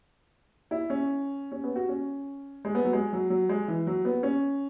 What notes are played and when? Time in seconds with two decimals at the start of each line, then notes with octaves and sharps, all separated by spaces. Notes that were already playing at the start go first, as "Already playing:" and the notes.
0.71 E4
0.90 C#4
1.52 C#4
1.64 B3
1.76 F#4
1.89 C#4
2.65 G#3
2.75 B3
2.85 F#3
2.93 G#3
3.13 F#3
3.30 F#3
3.49 G#3
3.68 E3
3.87 F#3
4.05 B3
4.23 C#4